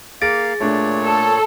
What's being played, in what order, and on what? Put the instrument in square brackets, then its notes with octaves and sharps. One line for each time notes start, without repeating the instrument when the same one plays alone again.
[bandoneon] A#3 F5 [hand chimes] G#4 A6 [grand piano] D7
[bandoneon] A#2 C#5 [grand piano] A3 D4
[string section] A4